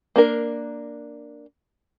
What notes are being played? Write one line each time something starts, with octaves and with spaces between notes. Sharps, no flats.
A#3 D4 A#4